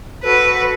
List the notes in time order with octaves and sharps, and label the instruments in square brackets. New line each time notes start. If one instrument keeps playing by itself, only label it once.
[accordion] F#4 A4 [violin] B4